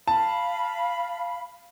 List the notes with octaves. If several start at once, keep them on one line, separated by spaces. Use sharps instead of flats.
F5 A5 B5